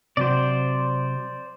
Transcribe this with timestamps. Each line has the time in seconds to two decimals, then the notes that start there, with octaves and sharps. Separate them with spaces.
0.17 C3 F#3 C5 D5